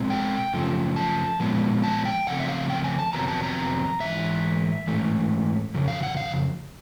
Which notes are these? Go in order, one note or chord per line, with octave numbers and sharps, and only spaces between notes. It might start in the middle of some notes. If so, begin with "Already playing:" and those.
Already playing: B2 G#3 C4
G5
F#2 C#3 F3 A3
A5
A#2 F3 G#3 B3
A5
G5
C#3 F3 A3 C4 F#5
E5
F5
G5
G#5
A5
F2 C3 D#3 F#3 B3 A#5
A5
A#5
G#2 E3 E5
G#2 E3 A3
F2 C#3
F5
F#5
F5